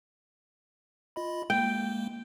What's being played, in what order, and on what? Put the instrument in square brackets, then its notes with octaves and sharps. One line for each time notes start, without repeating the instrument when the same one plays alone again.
[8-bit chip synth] F4 D#5 B5
[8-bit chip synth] G#3 A#3 [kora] G5